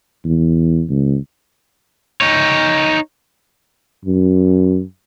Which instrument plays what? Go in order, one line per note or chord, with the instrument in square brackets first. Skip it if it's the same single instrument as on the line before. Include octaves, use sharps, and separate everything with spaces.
[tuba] E2
C#2
[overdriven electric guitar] D#4 C#5
[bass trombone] F#2